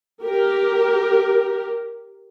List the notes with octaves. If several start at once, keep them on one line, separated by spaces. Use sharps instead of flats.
G4 A#4